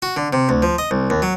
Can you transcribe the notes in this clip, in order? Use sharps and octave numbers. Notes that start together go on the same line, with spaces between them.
F#4
D3
C3
D2
F3
D#5
C2
D#2
F#3